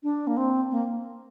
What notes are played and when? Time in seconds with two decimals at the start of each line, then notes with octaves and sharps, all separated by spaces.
0.03 D4
0.27 A#3
0.37 C4
0.71 A#3